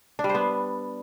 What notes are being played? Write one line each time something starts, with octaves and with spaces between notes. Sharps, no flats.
D4
G3
C5
B3